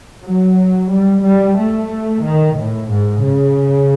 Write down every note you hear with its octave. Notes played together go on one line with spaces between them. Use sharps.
F#3
G3
G3
A3
D#3
A2
G#2
C#3